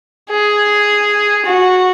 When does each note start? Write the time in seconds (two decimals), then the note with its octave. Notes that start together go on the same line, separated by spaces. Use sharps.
0.30 G#4
1.46 F#4